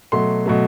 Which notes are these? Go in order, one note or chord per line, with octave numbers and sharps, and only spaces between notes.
B2 F#3 A3 C6
B2 F#3 A3